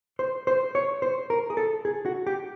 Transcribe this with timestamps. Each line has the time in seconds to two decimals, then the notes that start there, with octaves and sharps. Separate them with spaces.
0.19 C5
0.47 C5
0.75 C#5
1.02 C5
1.30 A#4
1.50 G#4
1.57 A4
1.85 G#4
2.06 F#4
2.27 G4